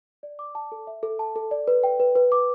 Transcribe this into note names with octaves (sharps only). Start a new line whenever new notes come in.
D5
D6
A5
A4
E5
A4
A5
A4
D5
B4
G5
B4
B4
D6